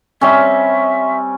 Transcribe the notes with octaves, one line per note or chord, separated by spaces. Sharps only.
G3 C4 C#4 E5